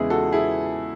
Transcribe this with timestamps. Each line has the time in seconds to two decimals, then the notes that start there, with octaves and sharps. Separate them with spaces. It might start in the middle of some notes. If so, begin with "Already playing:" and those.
Already playing: E2 C#3 G#3 E4 G#4
0.10 F#4 A4
0.32 E4 G#4